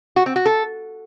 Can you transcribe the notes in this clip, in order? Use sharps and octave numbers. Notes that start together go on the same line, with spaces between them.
F#4
C4
F#4
A4